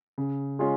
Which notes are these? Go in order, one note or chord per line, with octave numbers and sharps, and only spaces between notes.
C#3
G#3 C#4 F4